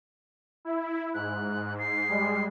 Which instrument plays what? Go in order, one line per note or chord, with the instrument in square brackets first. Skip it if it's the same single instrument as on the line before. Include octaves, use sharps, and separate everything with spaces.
[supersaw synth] E4
[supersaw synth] G#2 [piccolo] F#6
[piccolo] C7
[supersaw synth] G3 G#3